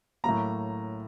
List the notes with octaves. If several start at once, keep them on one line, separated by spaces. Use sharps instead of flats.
A2 F#3 A#3 A#5